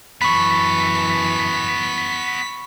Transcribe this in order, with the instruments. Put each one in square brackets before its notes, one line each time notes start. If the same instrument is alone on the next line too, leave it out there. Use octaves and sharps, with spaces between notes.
[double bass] F#2 E3 [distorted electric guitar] B3 A4 [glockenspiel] B5 C#6 [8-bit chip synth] B6